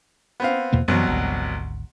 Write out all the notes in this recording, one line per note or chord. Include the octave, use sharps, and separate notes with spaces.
B3 C4 F5
E2 B2 A#3
C2 F#2 B2 E3 F#3
G#1 D2